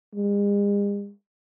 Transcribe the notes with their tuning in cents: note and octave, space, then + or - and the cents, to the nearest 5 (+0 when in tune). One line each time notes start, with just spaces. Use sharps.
G#3 -45